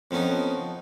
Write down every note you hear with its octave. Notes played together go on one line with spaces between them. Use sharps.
F2 F3 B3 C#4 D#4